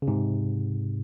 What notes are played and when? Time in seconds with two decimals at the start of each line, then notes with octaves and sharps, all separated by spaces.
0.02 C#3
0.07 G#2 C3